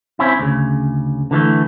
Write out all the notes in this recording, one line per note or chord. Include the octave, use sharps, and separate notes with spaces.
C4 C#4 E4
D2 C#3
D3 E3 G#3 A3